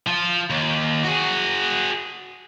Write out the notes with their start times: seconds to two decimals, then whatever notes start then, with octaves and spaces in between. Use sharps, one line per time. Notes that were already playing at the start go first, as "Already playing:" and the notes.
0.07 F3 F4
0.50 D#2
1.04 F#4 G#4